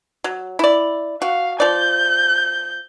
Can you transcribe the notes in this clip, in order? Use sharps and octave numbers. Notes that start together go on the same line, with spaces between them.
F#3
E4 D5
F#4 F5
F3 D5 G6